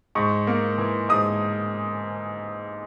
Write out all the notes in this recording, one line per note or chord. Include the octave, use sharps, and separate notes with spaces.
G#2 C#6
A#3
E3
G#2 D#6